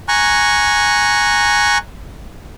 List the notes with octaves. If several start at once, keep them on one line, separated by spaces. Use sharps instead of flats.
G#5 A#5 C#6 F#6